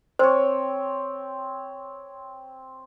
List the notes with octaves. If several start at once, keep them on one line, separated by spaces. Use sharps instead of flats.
C4 C5 C#5